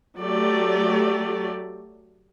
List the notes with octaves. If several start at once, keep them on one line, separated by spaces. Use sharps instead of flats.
F#3 A3 G4 D5